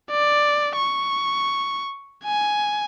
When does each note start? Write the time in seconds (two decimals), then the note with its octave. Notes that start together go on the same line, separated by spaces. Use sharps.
0.11 D5
0.76 C#6
2.24 G#5